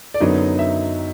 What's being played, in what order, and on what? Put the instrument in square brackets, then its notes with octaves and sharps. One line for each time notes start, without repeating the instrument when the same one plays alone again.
[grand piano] D5
F#2 D3 F#3 B3 D#4 D#5
E5